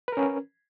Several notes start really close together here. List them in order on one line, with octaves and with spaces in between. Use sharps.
B4 A#4 C#4